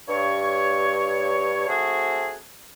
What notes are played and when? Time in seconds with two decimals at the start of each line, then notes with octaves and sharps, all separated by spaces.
0.08 G2 C#5
1.68 A3 C4 F#4 G#4